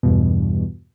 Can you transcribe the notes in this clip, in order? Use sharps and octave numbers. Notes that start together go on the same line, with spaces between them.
E2 G2 B2